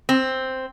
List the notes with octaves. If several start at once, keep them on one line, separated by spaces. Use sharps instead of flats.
C4